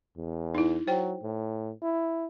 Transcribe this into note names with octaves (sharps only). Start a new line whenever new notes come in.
E2
D#4 E4
F#3 C5 G5
A2
E4